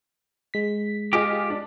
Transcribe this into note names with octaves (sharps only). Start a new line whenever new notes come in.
G#3 B6
F4 G4 G#4 D#5
D4